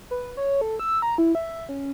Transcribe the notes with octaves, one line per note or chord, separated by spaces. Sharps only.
B4
C#5
A4
E6
A#5
E4
E5
C#4